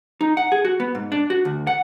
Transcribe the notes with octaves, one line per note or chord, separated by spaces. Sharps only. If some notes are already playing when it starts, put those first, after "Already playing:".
D#4
F#5
G#4
F#4
B3
G#2
D4
F#4
D2
F#5